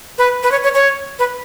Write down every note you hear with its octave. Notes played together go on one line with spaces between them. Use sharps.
B4
B4
C#5
C#5
C#5
B4